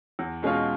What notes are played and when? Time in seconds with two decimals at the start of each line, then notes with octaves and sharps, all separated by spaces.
0.19 E2
0.43 B2 G#3 C#4 F4